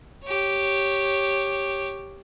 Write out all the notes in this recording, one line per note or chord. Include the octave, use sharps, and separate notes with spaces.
G4 C#5